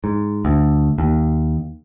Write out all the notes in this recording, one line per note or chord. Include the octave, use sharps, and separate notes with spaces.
G#2
D2
D#2